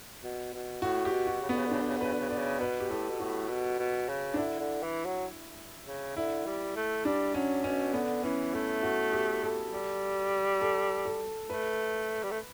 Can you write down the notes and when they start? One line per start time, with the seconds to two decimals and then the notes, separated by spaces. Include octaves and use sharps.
0.23 B2
0.53 B2
0.82 A2 F#4
1.05 G4
1.12 B2
1.27 F#4
1.41 C#3
1.49 D3 B3
1.57 C#3
1.65 D3
1.71 C#3 D4
1.81 D3
1.88 C#3
1.97 D3
2.01 C#3 B4
2.13 D3
2.20 C#3
2.29 D3 D5
2.36 C#3
2.60 B2 B4
2.80 G4
2.89 A2 A4
3.09 B2
3.19 A2 F#4
3.49 B2
3.79 B2
4.09 C#3
4.34 D4
4.38 D3 E4
4.60 D3
4.83 E3
5.05 F#3
5.86 C#3
6.16 D3 E4
6.46 G3
6.76 A3
7.05 G3 D4
7.34 F#3 C#4
7.64 B2 C#4
7.93 D3 B3
8.23 E3 C#4
8.53 A3 E4
8.83 F#4
9.13 G4
9.42 A4
9.71 G3
10.61 A4
11.05 A4
11.49 A3 B4
12.23 G3
12.31 A3